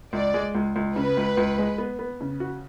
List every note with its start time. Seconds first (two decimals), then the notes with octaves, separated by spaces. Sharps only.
0.13 C#2 D5
0.34 G#3
0.55 C#2
0.76 C#2
0.96 C#3 B4
1.17 C#2
1.37 C#2
1.58 G#3
1.78 B3
1.99 B3
2.21 C#3
2.40 F#4